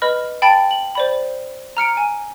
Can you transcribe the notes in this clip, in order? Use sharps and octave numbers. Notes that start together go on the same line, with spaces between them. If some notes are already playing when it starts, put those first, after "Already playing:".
B4 D#5 B5 F6
G5 A5 B5 A6 D7
F#7
C5 D5 B5
A#5 F6 C#7 D7
G#5